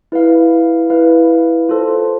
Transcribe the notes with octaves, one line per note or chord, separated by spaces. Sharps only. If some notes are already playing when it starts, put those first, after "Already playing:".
E4 B4 F5
E4 B4 F5
F4 A4 C5